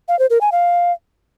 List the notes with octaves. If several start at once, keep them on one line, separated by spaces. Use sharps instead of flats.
F5
C5
A#4
G#5
F5